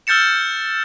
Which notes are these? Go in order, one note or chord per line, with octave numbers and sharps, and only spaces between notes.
E6 F6 G6 A6 C#7 E7